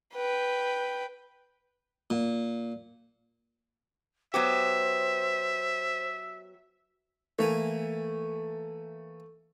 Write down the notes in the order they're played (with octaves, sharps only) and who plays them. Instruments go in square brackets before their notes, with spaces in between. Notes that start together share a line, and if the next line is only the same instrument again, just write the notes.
[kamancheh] B4 G5
[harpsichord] A#2
[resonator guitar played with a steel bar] F#3 B3 G4 [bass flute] C5 [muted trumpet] E5
[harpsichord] E3 A#3 G#5 [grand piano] A3